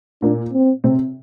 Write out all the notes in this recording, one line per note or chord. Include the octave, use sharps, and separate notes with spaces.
A#2 A#3 D4
C4
C3 C4